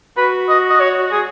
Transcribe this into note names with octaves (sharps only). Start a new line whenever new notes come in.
F#4 B4
D#5
D#5
C#5
G#4